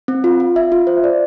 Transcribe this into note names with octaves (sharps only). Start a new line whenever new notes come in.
C4
F4
F4
E5
F4
C5
D5